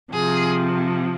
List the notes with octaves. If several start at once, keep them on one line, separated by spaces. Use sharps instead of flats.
C3 F3 G#4